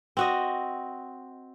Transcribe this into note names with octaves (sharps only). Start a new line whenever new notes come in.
C4 F#4 D#5